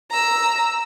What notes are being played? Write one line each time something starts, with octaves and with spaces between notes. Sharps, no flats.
A#5 E6